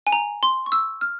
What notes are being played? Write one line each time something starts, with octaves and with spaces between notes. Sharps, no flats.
G#5
A#5
C6
C#6
E6
F6